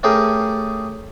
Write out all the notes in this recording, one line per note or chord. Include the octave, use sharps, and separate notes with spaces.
A3 C#4 G4 G#4 A#4